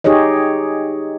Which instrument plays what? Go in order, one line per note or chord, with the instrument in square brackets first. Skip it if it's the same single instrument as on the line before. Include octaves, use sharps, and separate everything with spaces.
[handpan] D#4 G4 G#4 C#5 D#5